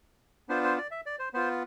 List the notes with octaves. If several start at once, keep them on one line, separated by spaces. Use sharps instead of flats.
B3 D4 F4 C5
C5
D5
E5
D5
C5
B3 F4 C5